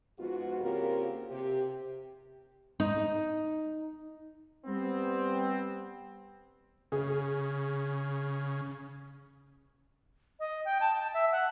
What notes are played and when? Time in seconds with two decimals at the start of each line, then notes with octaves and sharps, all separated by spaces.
0.19 G#2 F3 B3 F4 F#4
0.60 C#3 A#3 C4 F4 G4 A#4
1.31 C3 G4
2.80 D#4
4.66 G3 B3 C4
6.92 C#3 G#4
10.40 D#5
10.65 G5
10.81 A5
11.14 E5
11.32 F#5